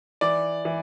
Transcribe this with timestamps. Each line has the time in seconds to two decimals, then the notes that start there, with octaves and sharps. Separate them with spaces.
0.21 E3 D5
0.65 E3